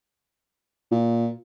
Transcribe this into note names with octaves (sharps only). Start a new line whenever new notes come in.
A#2